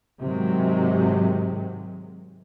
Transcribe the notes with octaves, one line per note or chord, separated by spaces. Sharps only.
G#2 C3 D#3 F#3 G#3